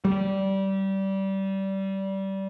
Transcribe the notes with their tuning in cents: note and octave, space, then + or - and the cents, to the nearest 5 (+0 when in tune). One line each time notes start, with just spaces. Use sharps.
G3 -20